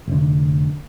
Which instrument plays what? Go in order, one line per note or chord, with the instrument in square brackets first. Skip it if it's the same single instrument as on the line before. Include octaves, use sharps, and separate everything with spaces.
[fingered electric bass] F1 D3